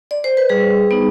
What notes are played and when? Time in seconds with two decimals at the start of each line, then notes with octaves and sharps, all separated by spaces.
0.11 D5
0.24 C5
0.37 B4
0.49 G3 G#4
0.91 B3 D#4